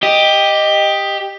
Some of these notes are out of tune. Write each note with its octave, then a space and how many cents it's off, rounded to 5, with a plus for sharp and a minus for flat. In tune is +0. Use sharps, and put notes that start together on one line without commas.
G4 +10 D#5 +0